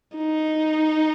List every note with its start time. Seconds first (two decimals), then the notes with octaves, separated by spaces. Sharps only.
0.16 D#4